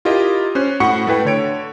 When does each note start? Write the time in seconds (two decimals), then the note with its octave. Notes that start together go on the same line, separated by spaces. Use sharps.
0.05 E4 F4 G4 A#4 D#5
0.55 C#4 C5 F#6
0.80 A2 F#4 F#5 B5 C#6 C#7
1.07 A3 E4 B4 G5
1.25 D3 C#5 D7